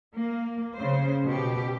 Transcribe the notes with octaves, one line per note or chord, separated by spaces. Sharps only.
A#3
C#3 C5
B2 G4